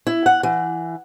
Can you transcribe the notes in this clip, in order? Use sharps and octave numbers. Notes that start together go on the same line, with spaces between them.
E4
F#5
E3